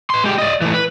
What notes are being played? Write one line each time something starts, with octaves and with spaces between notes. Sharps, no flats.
B4 C6
G#3 G4
D5 D#5
E3 A3
B4